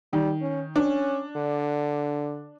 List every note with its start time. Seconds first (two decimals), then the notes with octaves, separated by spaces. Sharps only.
0.13 D#3 G3
0.41 C#4
0.76 C#4 D4
1.36 D3